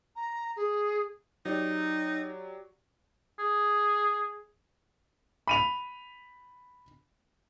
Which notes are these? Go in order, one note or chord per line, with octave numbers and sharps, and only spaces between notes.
A#5
G#4
F#3 D#4 G4 D5
G#4
B5 D#7 F7